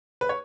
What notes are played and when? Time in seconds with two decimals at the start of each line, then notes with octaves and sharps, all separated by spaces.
0.21 B4
0.29 C#5